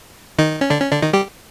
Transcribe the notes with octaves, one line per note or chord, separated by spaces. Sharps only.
D#3 D#4
C#4
D3 D4
C#4
D3 D4
D#3 D#4
G3 G4